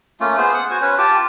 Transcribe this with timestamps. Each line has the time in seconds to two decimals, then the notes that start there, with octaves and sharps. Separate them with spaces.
0.20 A3 A#3 C#4 F4
0.38 B3 G#4 C5
0.54 F#5
0.70 F#4 C5 G#5
0.82 C#4 B4 C#5
0.98 F4 G4 A5 D6